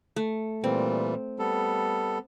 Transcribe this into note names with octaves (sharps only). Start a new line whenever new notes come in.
A3
A#2 E3 G3 C4
G3 B3 A4